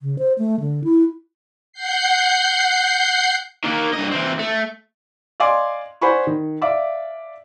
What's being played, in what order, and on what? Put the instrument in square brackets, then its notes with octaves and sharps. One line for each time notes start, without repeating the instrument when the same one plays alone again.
[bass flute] C#3
C5
A3
D3
E4
[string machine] F#5 G6 C7
[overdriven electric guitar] D#3 A#3
G2 D#5
E3 C4
A3
[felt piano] D5 D#5 F5 G#5 C6 D6
C5 D5 F#5 G#5 B5 C#6
D#3
D5 E5 F5 D6